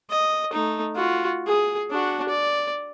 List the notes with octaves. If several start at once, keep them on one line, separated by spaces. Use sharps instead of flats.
D#5
A3 D#4
F4 F#4
G#4
D4 F#4
D5